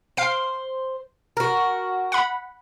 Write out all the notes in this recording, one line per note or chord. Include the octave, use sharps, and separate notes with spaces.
C5 F5 C7 D7
F#4 A#4
F#5 B5